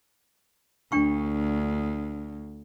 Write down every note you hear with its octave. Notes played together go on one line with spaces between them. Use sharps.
D2 D4 G5 C#6